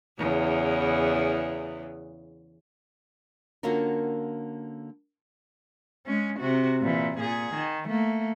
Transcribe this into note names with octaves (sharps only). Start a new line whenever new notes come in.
E2 C#3 E3
D3 A#3 C#4 F4 F#4 A#4
G#3 C#4
C3 F#4
A#2 E3
A#2 G#4
D#3
A3 A#3